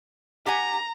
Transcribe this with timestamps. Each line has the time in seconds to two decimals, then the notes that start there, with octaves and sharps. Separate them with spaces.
0.46 G4 F#5 G#5 A#5